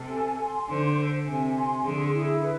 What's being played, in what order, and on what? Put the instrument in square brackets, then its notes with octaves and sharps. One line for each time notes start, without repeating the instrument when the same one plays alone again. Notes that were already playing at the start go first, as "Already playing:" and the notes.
Already playing: [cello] C3 [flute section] A4
[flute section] G#5
C6
[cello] D3 [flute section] C5
[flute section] A4
[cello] C3 [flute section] G#5
[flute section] C6
[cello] D3 [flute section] G#4
[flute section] E4
B4